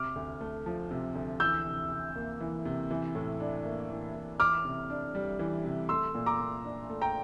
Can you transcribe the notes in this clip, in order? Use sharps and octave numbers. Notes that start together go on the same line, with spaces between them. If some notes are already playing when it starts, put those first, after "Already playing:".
Already playing: C3 D6 F6
D2
A3
F3
C3
D2
E3 E6 G6
C3
C3
A#3
E3
C3
E3
A2
D4
A#3
E3
A2
E3 D6 F6
C3
D4
G3
E3
C3
A3 C6 E6
A#2
A#5 D6
A#2
D4
A3
G5 A#5